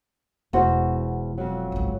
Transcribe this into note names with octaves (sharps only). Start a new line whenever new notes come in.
E1 E2 F#4 C5
F2 F#3
G#1 C#2